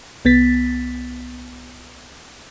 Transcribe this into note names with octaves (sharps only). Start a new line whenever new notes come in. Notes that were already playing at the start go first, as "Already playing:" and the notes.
C2 B3 A6 B6